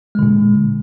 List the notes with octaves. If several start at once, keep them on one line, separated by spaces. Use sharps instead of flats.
A#2 D3 G#3